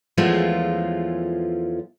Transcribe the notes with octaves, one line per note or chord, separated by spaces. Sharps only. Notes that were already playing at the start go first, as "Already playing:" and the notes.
E2 F3 G#3 A3 C#4 F4